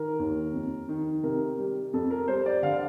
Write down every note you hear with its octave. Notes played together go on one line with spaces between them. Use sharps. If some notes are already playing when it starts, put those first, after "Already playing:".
Already playing: D#3 A#4
D#2
F2
D#3
C3 A#4
G3
F2 A4
A#4
G3 C5
D5
D3 F5